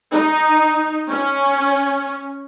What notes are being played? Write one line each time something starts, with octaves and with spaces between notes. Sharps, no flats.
D#4
C#4